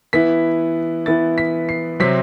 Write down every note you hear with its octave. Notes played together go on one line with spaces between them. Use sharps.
E3 B3 E4 B6
E3 B3 E4 A6
B6
C7
C3 F#3 C4 B6